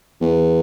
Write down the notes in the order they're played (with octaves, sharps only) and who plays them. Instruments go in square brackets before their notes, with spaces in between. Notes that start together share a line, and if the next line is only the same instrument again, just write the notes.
[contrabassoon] E2